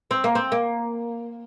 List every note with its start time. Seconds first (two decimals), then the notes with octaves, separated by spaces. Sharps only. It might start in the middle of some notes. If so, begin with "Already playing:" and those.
0.11 C4
0.24 A#3
0.35 C4
0.52 A#3